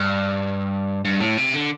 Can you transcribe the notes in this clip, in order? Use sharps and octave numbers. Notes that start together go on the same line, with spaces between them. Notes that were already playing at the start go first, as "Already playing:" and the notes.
Already playing: G2
G2
A2
C3
D3